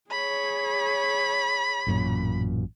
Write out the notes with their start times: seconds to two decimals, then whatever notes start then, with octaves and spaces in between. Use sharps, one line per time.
0.11 G#4 C#5 B5
1.87 A1 F#2 A#2